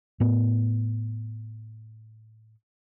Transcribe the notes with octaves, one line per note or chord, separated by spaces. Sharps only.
A2 B3